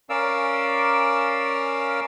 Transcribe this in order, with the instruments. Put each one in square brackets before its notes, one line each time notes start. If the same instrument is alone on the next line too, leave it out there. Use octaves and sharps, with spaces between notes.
[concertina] C#4 A#4 D5 F5 E6